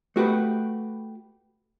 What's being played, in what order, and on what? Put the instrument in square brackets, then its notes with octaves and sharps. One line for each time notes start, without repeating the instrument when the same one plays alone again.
[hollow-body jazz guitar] A3 F#4 G4 B4